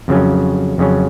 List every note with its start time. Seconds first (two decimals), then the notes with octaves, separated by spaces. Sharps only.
0.08 F2 C#3 F#3 C#4
0.78 F2 C#3 F#3 C#4